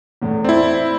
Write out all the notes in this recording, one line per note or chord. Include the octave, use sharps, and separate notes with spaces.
E2 A2
C4 E4 D5